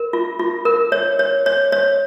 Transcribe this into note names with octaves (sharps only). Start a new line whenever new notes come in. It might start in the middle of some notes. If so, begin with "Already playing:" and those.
Already playing: A#4
F4
F4
A#4
C#5
C#5
C#5
C#5